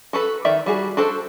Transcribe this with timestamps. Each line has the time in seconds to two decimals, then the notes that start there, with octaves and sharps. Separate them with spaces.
0.13 F#4 A4 B4
0.45 D#3 D5 E5
0.66 G3 F#4 G#4
0.97 D4 F#4 A4 C5